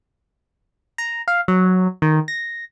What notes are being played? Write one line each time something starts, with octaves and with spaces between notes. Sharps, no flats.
A#5
F5
F#3
D#3
A#6